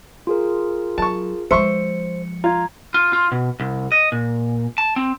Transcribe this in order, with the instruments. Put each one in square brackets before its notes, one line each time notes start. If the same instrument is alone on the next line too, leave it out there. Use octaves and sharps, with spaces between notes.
[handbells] F4 G#4 A#4
[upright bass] F#3 [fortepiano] A5 C#6
[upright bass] F3 G#3 [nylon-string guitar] C5 [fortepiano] E5 C6 C#6 [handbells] C#7
[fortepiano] F4 [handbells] A#5 G#6
[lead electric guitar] F4
F4
B2
C2
D#5
A#2
A5
C4